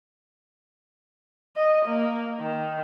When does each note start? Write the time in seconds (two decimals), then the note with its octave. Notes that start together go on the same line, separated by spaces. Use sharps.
1.56 D#5
1.86 A#3
2.40 D#3